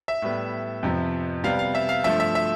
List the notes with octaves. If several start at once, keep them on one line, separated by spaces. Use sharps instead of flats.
E5
A2 G3 B3
F2 C3 F3 B3
C3 G3 B3 F5
F5
E5
F5
G2 F3 A3 E5
E5
E5